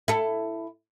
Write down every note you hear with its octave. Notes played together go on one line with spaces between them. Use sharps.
E4 A4